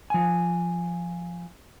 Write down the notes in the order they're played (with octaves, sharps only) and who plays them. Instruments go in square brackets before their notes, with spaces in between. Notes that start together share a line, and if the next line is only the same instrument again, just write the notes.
[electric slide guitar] F3 G#5